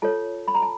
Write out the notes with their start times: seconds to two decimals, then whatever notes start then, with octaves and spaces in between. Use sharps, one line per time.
0.02 F4 A4 C#5 A5
0.48 B5
0.55 A#5
0.62 A5